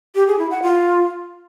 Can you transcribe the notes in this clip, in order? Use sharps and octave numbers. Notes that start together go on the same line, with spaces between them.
G4
G#4
E4
F#5
F4